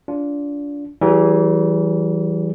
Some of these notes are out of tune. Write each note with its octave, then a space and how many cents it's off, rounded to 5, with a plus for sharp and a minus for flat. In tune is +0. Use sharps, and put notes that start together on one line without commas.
D4 -25 F4 +0
E3 +0 G3 -40 G#4 -10